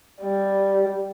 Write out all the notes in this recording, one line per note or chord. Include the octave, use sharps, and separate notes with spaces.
G3